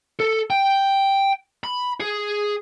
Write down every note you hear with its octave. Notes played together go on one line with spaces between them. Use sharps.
A4
G5
B5
G#4